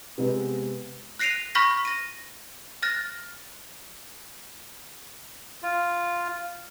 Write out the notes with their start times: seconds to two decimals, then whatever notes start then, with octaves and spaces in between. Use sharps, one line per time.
0.18 C3 G#3 B3
1.19 F#6 A#6 C7 D7 D#7 F7
1.55 B5 C#6 F6 G6 A#6 B6
1.85 A#6 D#7
2.83 F6 F#6 A6 A#6
5.63 F4